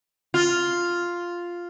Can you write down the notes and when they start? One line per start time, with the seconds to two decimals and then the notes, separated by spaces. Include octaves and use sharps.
0.34 F4